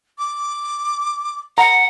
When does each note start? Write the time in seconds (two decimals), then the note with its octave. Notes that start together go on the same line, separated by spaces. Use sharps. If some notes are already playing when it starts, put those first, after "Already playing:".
0.18 D6
1.58 F#5 A#5 B5